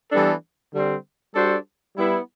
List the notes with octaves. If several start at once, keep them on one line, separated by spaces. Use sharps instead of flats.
E3 G3 B3 D4 A4
D3 G3 C4
G3 D4 F#4 A4 C5
G3 B3 E4